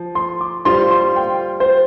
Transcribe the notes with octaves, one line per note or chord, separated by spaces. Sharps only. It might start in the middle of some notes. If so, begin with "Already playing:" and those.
Already playing: F3
C6
D6
G3 F4 C5 F5 C6
C6
G5
C5